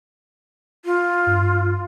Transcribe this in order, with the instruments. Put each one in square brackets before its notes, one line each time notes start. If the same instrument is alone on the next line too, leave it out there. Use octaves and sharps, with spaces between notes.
[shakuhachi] F4
[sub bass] G2